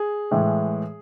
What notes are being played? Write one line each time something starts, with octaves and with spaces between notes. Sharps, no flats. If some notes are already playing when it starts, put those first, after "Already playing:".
Already playing: G#4
A2 E3 G#3